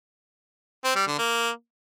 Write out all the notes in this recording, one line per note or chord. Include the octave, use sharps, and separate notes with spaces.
C4
G3
D3
A#3